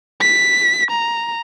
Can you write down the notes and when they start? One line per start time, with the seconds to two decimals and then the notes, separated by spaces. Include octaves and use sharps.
0.21 B6
0.91 A#5